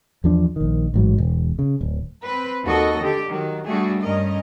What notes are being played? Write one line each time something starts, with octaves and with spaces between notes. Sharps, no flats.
E2 F3 D4
A#1 D#3
A1 G#2 F#3
E1
C#3
D1
C4 B4
D#2 F#4 A4 D#5
D3 G4
D#3 F#3
G3 A3 D4 F#4 G#4
G2 C#4 A#4 D#5